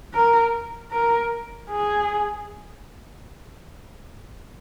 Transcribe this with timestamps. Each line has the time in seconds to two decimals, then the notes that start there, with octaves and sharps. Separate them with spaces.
0.14 A#4
0.92 A#4
1.70 G#4